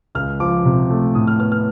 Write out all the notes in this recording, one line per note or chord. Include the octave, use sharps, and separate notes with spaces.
C#2 F6
F3 D6
C3
A3
A2 D#6
F6
B3 F6
F6